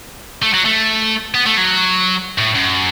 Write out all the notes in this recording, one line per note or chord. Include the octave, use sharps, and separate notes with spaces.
A3
F#3
A3
B3
A3
F#3
A2
F#2